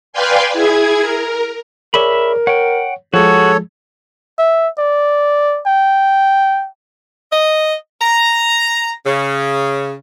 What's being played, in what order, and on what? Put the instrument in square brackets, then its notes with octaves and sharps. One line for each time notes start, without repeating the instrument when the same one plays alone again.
[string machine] B4 D5 F5 G5 G#5 C6
E4 G#4 G#6
A#4
[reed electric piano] G#4 C#5 D5 [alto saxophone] A#4 [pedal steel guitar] E5 B5
[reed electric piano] C#5 [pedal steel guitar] F#5 G5
[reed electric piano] F3 G#3 [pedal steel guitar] F#4 [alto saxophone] G#4 [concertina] A4 C#5
[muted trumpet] E5
D5
G5
[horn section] D#5
A#5
C#3